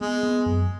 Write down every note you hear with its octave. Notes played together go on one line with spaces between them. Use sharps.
G#3 B3
B3
F#2